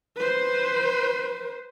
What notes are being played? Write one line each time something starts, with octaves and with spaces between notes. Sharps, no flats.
B4 C5